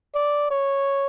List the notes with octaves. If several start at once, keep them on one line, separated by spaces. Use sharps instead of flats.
D5
C#5